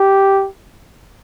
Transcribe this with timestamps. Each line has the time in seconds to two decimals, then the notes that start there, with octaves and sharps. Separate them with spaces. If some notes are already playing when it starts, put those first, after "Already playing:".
Already playing: G4